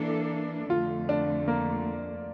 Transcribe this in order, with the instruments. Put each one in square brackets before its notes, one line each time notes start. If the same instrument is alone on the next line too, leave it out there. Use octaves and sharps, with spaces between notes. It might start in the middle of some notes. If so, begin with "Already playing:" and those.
Already playing: [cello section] E3 A#3 D4 A4 [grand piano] E4
[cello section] F2 D3 A3 [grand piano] F4
[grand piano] D4
A#3